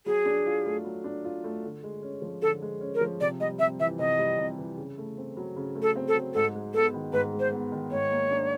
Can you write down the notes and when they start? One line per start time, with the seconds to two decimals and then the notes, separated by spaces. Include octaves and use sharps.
0.06 F#3 G#4
0.26 D4
0.46 F4
0.66 A3
0.84 F#3
1.04 D4
1.24 F4
1.44 A3
1.64 D3
1.83 G#3
2.03 C#4
2.22 F3
2.42 D3 A4
2.62 G#3
2.81 C#4
2.95 A#4
3.01 F3
3.21 C3 D5
3.40 G3 D#5
3.59 C3 E5
3.80 E3 E5
3.99 C3 D#5
4.19 G3
4.39 C3
4.58 E3
4.78 C#3
4.98 A3
5.17 C4
5.37 F#3
5.56 C#3
5.75 A3
5.82 A4
5.96 C4
6.08 A4
6.14 F#3
6.34 G#2 A4
6.55 G#3
6.74 B3 A4
6.94 D#3
7.13 G#2 B4
7.33 G#3
7.39 C5
7.52 B3
7.72 D#3
7.91 G#2 C#5
8.11 A#3
8.31 D4